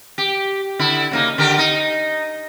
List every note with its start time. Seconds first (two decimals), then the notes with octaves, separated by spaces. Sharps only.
0.18 G4
0.79 D3 E4
1.11 C#3 A#3 D#4
1.38 D3 G4 A#4
1.58 D#4